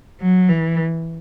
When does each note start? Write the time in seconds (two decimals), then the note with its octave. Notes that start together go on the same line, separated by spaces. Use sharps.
0.21 F#3
0.49 E3